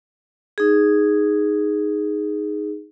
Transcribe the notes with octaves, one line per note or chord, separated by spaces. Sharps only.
D#4 G#4